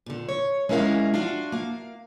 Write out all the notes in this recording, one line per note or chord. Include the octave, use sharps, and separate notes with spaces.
A#2 D3
C#5
G#3 C#4 E4 A#4 F5
D4 F4 F#4 F5
A#3 F5